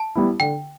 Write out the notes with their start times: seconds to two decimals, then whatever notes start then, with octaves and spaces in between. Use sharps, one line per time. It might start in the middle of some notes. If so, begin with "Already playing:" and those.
Already playing: A5
0.15 G3 B3 E4
0.40 D3 G5